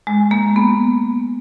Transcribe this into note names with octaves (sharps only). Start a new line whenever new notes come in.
G#3
A#3
B3